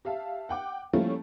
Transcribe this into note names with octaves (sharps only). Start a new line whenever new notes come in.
G4 E5 F5 A5
F#5 G5 D6
F3 G3 A3 A#3 C#4 E4